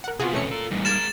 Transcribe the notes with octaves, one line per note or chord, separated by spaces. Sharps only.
A#4 F#5
C3 B3 F4 F#4 G#4
E2 B2 A3 C#4 C#5 C#7
F4 A4 A#4
E2 A2 G3 A#3 D#4
G#3 A#4 F6 G#6 A6 D7 E7